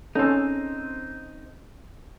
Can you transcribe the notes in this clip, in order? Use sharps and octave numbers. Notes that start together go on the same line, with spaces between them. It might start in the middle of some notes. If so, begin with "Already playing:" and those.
C4 C#4 D#4 A4